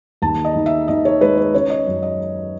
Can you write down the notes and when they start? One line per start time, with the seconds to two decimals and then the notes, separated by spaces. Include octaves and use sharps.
0.22 D#2 A5
0.45 D#5
0.55 D#3
0.66 E5
0.88 D#3 D#5
1.05 C#5
1.21 G#3 B4
1.38 C#5
1.54 C#4 C#5
1.70 D#5
1.87 F#2
2.03 D#5